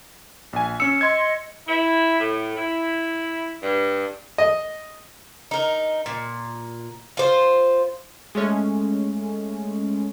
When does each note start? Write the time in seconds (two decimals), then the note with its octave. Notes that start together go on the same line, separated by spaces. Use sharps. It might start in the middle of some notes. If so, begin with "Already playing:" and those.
0.53 A#1 G#5
0.80 C#4 E6 C#7
1.01 D#5 C6 G#6
1.68 E4
2.20 A2
2.57 E4
3.63 G2
4.38 D#5
5.51 D#4 A#4
6.06 A#2
7.17 F4 C5
8.35 G#3 A3 C#4